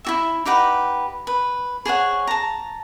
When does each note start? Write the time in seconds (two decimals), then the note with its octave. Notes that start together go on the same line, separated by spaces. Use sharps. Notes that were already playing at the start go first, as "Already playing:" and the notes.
0.05 E4 F#4 E5
0.45 D#4 G4 B4 F#5
1.27 B4
1.86 G#4 C5 C#5 F#5
2.27 A5 A#5